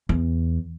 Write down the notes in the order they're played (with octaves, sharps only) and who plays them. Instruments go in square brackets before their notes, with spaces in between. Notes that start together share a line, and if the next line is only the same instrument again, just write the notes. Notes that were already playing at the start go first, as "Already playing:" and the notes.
[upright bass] E2